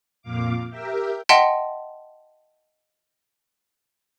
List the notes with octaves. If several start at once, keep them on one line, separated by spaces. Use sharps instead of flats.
F2 A#2 F5 D6
G4 A#4 E5 G5
D#5 E5 F#5 G5 A5 C6